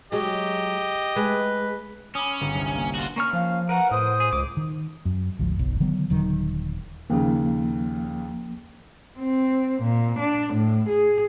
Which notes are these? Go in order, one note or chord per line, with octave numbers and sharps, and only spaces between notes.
F#3 G#3 G4 D#5
G#3 B4
C#4 B5 D6 D#6
G1
C2
A#3
F4 F#4
A#3 C#4 C#6 F6
F3 F5
A#4 B4 F#5 A#5
A2 C5 D#6
G#4
C#2 D6
D#3
F#2
G#1 D2 F3
F#1 B1
D3 D#3 F#3 B3
D#1 D3 D#3 F#3
D#2 C#3 F3 A#3
C4
A#2
D4
A2
G#4